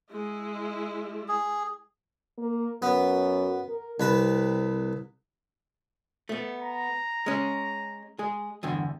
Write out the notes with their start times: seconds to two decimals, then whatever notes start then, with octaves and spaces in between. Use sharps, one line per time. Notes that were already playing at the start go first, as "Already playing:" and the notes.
0.12 G#3 E4
1.28 G#4
2.38 A#3
2.82 F#2 B3
3.69 A#4
4.00 C2 C3 B4 A5
6.29 A3 B3
6.62 A#5
7.26 G#3 C#4
8.19 G#3 G#4
8.63 E2 G2 D3